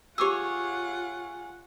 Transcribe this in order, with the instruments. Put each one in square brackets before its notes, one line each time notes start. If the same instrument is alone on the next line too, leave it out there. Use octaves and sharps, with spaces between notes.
[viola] F4 F#5 [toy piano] G4 D6 E6 [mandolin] G#4 C#5